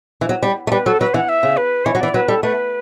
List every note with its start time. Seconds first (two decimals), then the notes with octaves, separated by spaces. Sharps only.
0.21 E3
0.29 F#3
0.43 G3
0.67 A3
0.71 G3 B4
0.86 F#3 A4
1.00 F#3 B4
1.14 E3 F#5
1.29 E5
1.43 C#3
1.57 B4
1.85 E3 C#5
1.95 F#3
2.00 E3 D5
2.14 F#3 B4
2.28 G3 A4
2.43 A3 B4